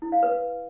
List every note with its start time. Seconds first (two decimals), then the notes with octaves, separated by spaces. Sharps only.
0.02 E4
0.12 F5
0.23 B4